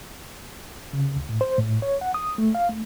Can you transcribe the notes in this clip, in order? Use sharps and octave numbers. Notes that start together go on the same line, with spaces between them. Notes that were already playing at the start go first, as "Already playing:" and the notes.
C#3
D2
A2
C5
A2
C#5
F#5
D#6
A3
F5
A3